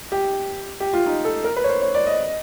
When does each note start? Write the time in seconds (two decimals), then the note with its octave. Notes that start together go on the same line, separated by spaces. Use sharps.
0.12 G4
0.80 G4
0.93 F4
1.07 D#4
1.25 A4
1.44 A#4
1.56 B4
1.64 C#5
1.69 C5
1.82 C#5
1.94 D5
2.07 D#5